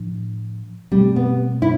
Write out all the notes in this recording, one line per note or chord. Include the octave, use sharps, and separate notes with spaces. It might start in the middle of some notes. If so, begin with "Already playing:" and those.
Already playing: A2 F3 D4
B2 G3 A3 C4
B3
E4